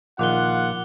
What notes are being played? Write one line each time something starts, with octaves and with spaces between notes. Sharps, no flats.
A#1 D#3 F4 F#5 D6 F#6 G7